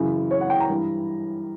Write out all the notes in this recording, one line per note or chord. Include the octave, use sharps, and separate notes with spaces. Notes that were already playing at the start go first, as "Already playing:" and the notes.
Already playing: F#2 C#3 E3
C#5
F#5
G5
A#5
G2 E3